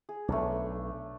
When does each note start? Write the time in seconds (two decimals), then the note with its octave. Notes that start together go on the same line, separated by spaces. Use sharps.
0.09 G#4
0.28 B1 A3 D4